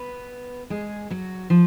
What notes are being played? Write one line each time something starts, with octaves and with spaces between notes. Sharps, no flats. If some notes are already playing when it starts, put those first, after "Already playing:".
Already playing: B3 B4
G#3 G#4
F#3 F#4
F3 F4